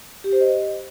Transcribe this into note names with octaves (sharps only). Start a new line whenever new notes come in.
G4
C5
D#5